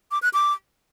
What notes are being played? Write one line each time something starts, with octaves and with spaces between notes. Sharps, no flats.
D6
F#6
D6